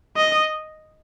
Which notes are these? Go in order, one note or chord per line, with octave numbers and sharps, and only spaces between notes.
D#5